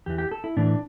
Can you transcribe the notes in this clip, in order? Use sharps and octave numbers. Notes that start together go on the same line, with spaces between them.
E2 E3 G4
G4
A4
E4
A2 E3 D4